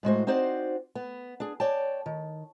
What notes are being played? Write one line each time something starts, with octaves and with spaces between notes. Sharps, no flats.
A2 G#3 F#4 C5
C4 D#4 F#4 C5 D5
B3
D4 G#4
C#5 D5 G5 A5
D#3